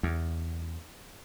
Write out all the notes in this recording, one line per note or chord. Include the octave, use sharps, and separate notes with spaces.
E2